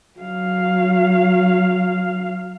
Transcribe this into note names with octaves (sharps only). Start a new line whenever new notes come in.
F#3 F5